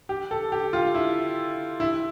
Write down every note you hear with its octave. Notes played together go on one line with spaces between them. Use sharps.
G4
A4
G4
F4
E4
E4